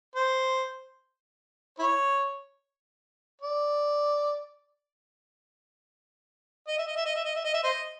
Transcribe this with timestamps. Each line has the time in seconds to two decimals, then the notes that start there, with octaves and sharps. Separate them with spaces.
0.16 C5
1.79 E4 C#5
3.42 D5
6.68 D#5
6.78 E5
6.87 D#5
6.96 E5
7.06 D#5
7.15 E5
7.25 D#5
7.36 E5
7.45 D#5
7.54 E5
7.63 C5 D#5